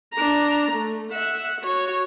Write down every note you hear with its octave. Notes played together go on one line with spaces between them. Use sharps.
D4 A#5
A3
E5 F#5
F#4 C#5